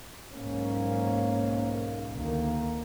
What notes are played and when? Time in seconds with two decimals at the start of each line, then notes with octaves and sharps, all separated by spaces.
0.34 B1 G#2 A#3 C#4
2.17 D2 D#3 A#3